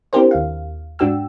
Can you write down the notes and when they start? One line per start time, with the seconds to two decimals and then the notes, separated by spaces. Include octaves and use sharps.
0.13 C4 D4 E4 G4 A#4 C5
0.31 D#2 F5
0.99 G#2 D4 F#4 G5 E6